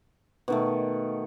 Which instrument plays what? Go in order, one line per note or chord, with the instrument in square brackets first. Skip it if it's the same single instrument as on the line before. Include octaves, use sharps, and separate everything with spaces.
[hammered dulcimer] B2 D#3 A3